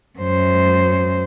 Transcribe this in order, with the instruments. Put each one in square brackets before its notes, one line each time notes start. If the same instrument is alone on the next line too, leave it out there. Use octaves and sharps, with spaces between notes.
[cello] F#2 C5